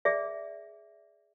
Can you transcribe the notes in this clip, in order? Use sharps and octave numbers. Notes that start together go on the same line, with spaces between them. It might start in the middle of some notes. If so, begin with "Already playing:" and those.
G#4 D5 E5